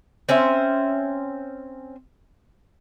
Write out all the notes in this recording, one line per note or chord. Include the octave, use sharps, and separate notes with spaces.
C4 C#4 C5 E5